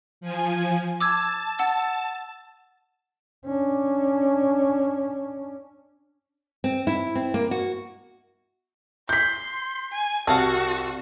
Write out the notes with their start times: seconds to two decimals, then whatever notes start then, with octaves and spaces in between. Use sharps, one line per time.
0.21 F3 G#5
1.00 A5 D6 E6 G#6
1.59 F#5 E6
3.45 C#4 D4
6.64 C4
6.87 E4
7.15 C4
7.34 A#3
7.51 F#4
9.09 C6 G6 B6
9.92 G#5
10.28 C2 F#4 F5 F#5 A5